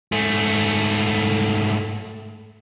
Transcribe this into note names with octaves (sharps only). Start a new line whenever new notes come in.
G#2 A3